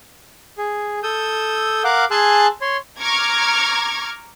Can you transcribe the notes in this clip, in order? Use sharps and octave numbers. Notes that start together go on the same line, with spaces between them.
G#4
A4 D#6 E6 G6
A#4 F5 F#5 D6
G#4 G#5 A5 C6 E6 F#6
C#5 C6
A#5 C#6 D6 F6 G#6